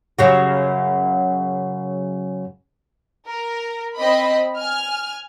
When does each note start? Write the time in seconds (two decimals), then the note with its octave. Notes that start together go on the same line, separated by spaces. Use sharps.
0.19 F#2 C#3 F#4
3.28 A#4
3.96 C4 D#5 B5
4.57 G#5 F6